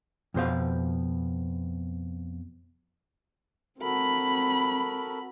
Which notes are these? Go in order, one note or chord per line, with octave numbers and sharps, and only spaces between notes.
F2 B2 C5 F5
C4 F#4 A4 A#4 B5